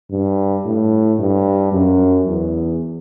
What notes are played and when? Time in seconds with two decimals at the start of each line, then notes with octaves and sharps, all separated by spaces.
0.11 G2
0.65 A2
1.19 G2
1.72 F#2
2.26 E2